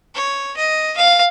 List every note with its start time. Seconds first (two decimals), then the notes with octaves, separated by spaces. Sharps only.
0.15 C#5
0.57 D#5
0.97 F5